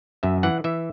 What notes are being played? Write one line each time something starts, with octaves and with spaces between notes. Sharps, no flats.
F#2 E5
E3 F#5
E3 E5